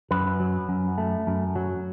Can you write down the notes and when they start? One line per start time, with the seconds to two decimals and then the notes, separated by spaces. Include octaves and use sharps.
0.11 F#2 B4
0.40 F#3
0.69 F#2
0.98 A3
1.27 F#2
1.56 F#3